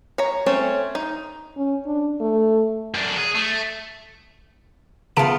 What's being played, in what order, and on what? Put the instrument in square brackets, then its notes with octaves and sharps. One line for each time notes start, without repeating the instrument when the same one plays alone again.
[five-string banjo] C#5 A#5
A3 C4 C#4 C#5
D#4
[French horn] C#4
D4
A3
[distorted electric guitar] F#2 D4
G#4
A3
[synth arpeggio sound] C#3 A5 D7 [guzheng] B3 F4